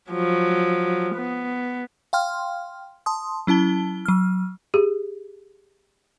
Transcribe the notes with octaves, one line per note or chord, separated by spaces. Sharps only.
F3 F#3
B3
F5 G5 C6 F6
A5 C6 D#6
F#3 C#4 E4 A5 G7
F#3 F6
G4 G#4